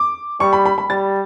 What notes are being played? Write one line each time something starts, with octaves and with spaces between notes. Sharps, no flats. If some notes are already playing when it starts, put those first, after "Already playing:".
Already playing: D6
G3 C#6
B5
B5
B5
G3 A6